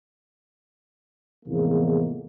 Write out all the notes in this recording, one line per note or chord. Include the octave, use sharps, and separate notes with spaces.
E2 A2 C3 F3 G#3 A#3